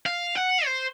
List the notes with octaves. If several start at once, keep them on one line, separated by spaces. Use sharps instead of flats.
F5
F#5
C5